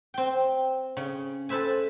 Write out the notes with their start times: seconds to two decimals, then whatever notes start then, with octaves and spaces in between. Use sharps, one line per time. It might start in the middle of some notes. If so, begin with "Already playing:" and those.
0.14 C4 G5
0.97 C#3
1.49 A4 B4 C5 E5 G#5